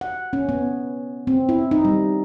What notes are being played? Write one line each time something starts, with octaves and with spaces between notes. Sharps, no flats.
F#5
C#4
B3
C4
E4
D#4
G3